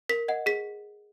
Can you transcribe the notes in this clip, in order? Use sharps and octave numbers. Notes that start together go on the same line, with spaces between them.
A#4 B6
D#5 F#5
G#4 B6